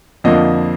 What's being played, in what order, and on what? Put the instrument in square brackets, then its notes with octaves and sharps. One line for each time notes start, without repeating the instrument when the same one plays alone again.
[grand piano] F2 D3 F3 A#3 D#5